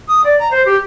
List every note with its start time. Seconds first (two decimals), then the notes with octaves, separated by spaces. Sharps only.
0.08 D#6
0.24 D5
0.39 A#5
0.51 C5
0.65 G4